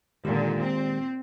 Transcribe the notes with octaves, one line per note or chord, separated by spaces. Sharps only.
A#2 D3 D#3 G#3 G4
C4